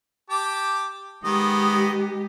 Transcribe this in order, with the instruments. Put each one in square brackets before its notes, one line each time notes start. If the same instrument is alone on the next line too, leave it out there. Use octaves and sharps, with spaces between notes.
[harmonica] G4 A5 D6
[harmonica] D#3 B3 D#5 [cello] G#3 G4